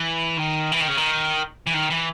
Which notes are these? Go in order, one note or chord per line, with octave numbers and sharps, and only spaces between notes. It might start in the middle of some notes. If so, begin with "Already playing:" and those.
Already playing: E3
D#3
E3
D#3
C#3
D#3
E3
D#3
E3